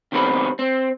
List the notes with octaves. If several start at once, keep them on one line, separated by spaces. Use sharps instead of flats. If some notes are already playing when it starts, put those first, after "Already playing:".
C3 D#3 G3 B3 C4 B4
C4